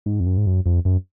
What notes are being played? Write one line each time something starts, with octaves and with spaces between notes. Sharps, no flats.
G#2
F2
F#2
G#2
F#2
F2
F#2